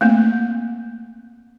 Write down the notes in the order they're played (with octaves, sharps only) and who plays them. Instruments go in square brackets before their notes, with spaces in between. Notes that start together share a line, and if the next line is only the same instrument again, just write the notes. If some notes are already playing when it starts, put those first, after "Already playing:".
[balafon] A3 A#3 C4